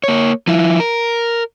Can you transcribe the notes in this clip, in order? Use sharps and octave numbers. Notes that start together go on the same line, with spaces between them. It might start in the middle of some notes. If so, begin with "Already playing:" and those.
A#3 C#5
F3 E4
A#4